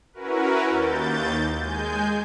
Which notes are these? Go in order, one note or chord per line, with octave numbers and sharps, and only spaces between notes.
C#4 E4 F#4 A#4 B4
D#2 G6 A6
G#3 G#5 G6